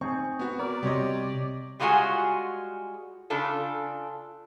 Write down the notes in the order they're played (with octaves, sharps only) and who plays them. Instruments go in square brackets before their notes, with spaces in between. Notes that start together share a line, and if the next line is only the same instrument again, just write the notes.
[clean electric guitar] C4 D#4 G#4 [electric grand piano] C#6
[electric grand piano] B3 F#4
[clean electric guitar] A#4 [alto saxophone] D5
[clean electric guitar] C2 C3 C6 [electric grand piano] G4 C#5 D#5
[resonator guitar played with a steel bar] G3 G#3 F4 F#4 G#4 G#5
C#3 D4 F4 A4